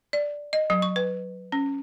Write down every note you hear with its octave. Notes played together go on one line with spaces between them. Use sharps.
D5
D#5
F#3
C#6
B4
C#4